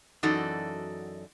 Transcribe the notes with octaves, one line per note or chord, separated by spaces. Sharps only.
F#2 E3 D#4 F#4 A4 D5